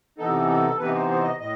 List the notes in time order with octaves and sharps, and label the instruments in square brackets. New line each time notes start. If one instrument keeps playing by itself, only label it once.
[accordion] C3 E3 B3 D#4 A4
A4
C3 E3 B3 D#4 B4
C5
C5
D#5
A2 D#5